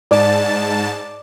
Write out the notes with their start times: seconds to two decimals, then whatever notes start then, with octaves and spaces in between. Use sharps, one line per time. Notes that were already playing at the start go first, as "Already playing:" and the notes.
0.11 G#2 D5 A5